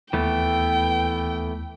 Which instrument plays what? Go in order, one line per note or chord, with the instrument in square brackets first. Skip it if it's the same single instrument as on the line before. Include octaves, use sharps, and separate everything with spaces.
[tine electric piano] D#2 [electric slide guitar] E3 A3 B3 [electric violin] G5